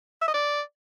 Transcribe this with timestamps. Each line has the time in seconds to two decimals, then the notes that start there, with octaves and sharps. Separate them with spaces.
0.22 E5
0.28 D#5
0.34 D5